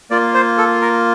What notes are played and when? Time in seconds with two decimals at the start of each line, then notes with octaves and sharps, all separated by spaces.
0.10 A#3 F4 D5
0.34 C5
0.58 A4
0.82 A#4